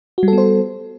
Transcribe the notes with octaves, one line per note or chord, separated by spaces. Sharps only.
G3 B3 F#4 A4 C5